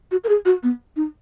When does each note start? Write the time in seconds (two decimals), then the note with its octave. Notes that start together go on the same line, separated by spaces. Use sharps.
0.11 F#4
0.24 A#4
0.29 G#4
0.45 F#4
0.63 B3
0.96 D#4